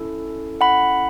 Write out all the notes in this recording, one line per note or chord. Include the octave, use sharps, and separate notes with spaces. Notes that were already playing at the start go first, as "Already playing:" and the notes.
Already playing: C#4 E4 A4
F#5 B5